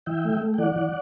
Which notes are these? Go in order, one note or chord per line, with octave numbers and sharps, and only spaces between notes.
E3 E5 G5
A3
A3
G5
E3 D5 F#5
E3